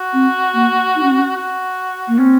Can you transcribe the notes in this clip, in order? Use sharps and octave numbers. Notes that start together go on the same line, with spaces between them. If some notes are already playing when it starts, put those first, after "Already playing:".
Already playing: F#4
C4
A#3
D#4
C#4
C4
C#4
F#4
A#3
C4 C#4